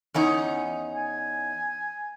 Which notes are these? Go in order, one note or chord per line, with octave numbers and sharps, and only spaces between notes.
E2 C#4 D#4
G#5